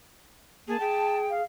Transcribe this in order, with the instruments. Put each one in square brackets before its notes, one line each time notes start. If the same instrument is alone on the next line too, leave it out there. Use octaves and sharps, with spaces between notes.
[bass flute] A#3 [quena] G#4 [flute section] A5
[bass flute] G#4 [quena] G5
[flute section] F5